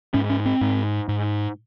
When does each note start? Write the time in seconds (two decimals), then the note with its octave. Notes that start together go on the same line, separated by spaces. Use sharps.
0.14 G#2 C#4
0.30 C#4
0.46 C4
0.61 G#2
1.09 G#2